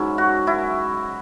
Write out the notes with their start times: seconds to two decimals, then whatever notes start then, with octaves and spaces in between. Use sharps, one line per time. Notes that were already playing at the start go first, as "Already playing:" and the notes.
Already playing: G#2 F#3 C#4 E4
0.18 F#4
0.47 E4